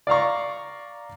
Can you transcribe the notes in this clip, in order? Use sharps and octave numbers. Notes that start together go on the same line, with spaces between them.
D5 F5 A#5 C#6